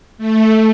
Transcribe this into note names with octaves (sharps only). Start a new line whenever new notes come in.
A3